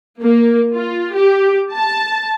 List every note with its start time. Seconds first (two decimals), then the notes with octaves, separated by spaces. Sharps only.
0.23 A#3
0.76 F4
1.14 G4
1.74 A5